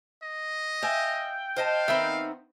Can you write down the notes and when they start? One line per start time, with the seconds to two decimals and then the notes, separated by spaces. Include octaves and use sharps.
0.23 D#5
0.83 E5 F5 G5 G#5
1.57 C5 D#5 F5 A5
1.88 D#3 B3 C4 E5 B5